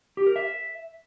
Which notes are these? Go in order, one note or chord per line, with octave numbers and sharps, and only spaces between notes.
G4
A#4
E5